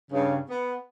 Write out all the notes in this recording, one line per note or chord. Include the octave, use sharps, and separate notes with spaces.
G2 C#3
B3